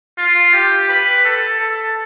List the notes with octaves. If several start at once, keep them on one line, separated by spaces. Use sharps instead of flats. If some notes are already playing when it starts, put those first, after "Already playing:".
F4
G4
B4
A4
A4